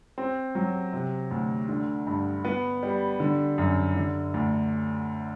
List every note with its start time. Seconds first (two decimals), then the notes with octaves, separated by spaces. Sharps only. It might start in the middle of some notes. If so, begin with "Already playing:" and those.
0.18 C4
0.55 F#3
0.93 C3
1.31 D2
1.69 D3
2.07 G2
2.45 B3
2.83 G3
3.20 D3
3.58 F#2
3.96 D3
4.34 D2